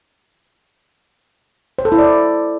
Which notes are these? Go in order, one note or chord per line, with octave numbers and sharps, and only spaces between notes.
C5
A4
E4
D5